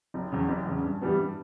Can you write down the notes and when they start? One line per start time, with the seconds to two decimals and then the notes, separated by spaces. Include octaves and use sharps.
0.14 F#1
0.32 E2 C#3
0.48 F#1
0.66 E2 C#3
0.83 G2
1.01 E3 G3 B3
1.18 G2